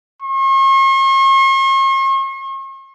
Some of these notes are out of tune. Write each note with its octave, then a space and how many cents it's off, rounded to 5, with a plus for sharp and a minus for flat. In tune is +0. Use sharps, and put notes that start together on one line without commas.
C#6 -45